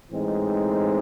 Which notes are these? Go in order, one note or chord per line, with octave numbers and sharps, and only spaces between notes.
A2 E3 G#3 C4 D#4